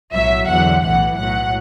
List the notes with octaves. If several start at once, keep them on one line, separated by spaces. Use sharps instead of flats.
B1 A2 F#3 E5
E2 D3 F#3 F#5
B1 A2 E3 F#5
B1 A2 F#3 F#5